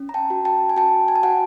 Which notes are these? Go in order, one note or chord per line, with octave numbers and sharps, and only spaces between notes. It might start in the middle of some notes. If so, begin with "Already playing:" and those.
Already playing: C#4
A#5
G5 A5
F#4
G5 A5
G#5
F#4 G5 A5
G#5
A5
F#4 F#5 G#5